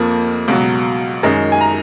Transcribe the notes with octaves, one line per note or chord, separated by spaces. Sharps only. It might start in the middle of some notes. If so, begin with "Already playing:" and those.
Already playing: F2 F3 A#3
C#2 B2 F#3
F#2 D#3 G#3 D#4
G#5
A#5